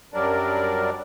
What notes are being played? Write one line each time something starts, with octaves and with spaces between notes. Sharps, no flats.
F#2 F#3 G3 D4 A#4 D5